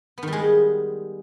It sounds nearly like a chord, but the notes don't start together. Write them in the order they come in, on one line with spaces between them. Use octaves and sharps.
B3 D#3 G3 G#3